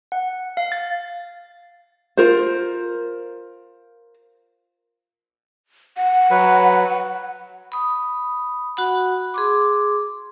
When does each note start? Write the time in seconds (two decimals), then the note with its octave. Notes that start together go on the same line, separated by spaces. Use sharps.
0.12 F#5
0.57 F5
0.72 A6
2.17 F4 A#4 C5
5.97 F#5
6.31 F#3 B4
7.72 B5 D#6
8.77 F#4 F#5 B5
9.34 G#4 C6 D6